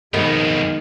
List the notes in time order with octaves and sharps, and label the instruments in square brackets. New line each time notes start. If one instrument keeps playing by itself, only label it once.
[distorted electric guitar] B1 F2 [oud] D#3 B3 [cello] G#3 D#5